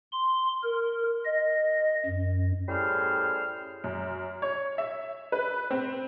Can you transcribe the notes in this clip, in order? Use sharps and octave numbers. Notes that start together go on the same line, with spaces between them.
C6
A#4
D#5
F#2
A2 G3 C#4 G#4 C5 F6
F#2
C#5
E5
B4
C4